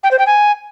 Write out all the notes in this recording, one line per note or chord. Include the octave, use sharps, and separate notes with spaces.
G5
C5
G5
G#5